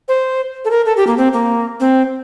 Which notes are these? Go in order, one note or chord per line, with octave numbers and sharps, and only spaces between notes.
C5
A4
A#4
A4
G4
A#3
C4
A#3
C4